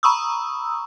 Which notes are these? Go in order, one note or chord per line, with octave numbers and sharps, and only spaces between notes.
A#5 B5 C#6 D#6 E6